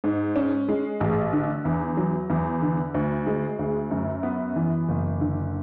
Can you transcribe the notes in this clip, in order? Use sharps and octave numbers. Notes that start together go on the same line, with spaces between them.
G#2
C#4
G#3
A1
D3
E2
F#3
E2
D3
D2
G#3
D2
F#2
B3
E3
F#1
D3